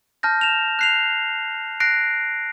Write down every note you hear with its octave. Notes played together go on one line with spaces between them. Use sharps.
A5 F6 G6 A#6
E7 F7
F#6 C7 F7
F#6 A#6 C7 D7